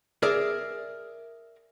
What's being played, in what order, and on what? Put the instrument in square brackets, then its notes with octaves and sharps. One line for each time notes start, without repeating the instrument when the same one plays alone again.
[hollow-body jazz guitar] G#4 A#4 D5 E5